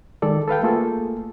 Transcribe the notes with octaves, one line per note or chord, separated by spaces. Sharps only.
D#3 G#3 A4 D5
A4 B4 F5 G5
A3 A#3 F4 G#4 A4